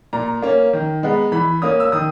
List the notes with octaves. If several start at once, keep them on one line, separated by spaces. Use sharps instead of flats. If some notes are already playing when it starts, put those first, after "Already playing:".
A#2 A#5
A#3 C#4
D#3
G#3 B3
E3 B5
A#3 C#4 D#6
E6
D#3 D#6